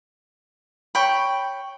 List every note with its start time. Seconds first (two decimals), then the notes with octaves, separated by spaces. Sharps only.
0.95 C#5 G5 B5